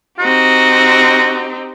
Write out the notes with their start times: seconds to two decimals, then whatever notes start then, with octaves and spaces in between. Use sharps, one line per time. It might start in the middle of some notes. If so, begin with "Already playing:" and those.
0.19 C4 D#4 F#4 G4